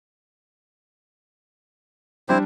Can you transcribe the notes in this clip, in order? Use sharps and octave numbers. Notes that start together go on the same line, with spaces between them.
G3 C4 D4 E4 C5